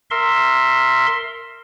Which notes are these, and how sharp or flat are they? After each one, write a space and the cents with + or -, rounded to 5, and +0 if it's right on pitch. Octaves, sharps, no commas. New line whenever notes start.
A#4 -15 E5 +0 C6 +10